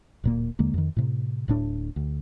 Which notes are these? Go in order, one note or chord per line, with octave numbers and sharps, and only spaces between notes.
D1 A#2 A#3
D#2 D3 G#3 A#3
F2 D#3
A2 C3
D1 A2 D4
D2